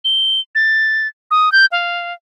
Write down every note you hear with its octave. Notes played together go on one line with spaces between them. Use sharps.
G7
A6
D#6
G6
F5